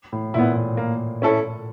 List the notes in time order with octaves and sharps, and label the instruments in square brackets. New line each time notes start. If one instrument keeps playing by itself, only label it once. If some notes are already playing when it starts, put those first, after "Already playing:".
[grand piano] A2
[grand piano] A#2 [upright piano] E4
[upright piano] B3
[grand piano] A2
[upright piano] A#3
C#4 E4 A4 C#5